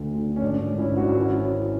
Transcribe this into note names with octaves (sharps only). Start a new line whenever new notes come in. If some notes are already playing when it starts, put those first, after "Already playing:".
Already playing: D2 D3
D3
C#4
G#1 D4
D4
G#2
C#4 E4
G#1
D4 F#4
C#4 E4
C#4